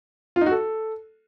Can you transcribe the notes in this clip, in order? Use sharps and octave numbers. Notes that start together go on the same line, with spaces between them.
F4
D#4
F#4
A4